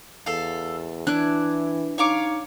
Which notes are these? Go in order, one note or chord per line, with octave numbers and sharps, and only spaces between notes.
E2 A4 F5
E3 D4 E4 F#6
D#4 C#5 F5 A#5 D6 C#7